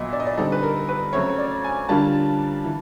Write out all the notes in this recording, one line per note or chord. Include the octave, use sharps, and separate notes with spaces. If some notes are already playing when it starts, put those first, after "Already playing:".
Already playing: A#2 F#3 B3 D#5 E5
D5
D#5
D5
D3 G3 C4 D#4 A4
B4
A#4
B4
C#3 F#3 A3 C4 C#5
D5
G#5
D3 G3 A#3 D4 F4 A5
E3